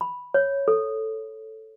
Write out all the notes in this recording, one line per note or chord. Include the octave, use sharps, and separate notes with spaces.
B5
C#5
A4